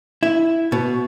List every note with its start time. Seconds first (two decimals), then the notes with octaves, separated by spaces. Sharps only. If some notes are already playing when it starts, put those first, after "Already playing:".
0.23 E4
0.72 B2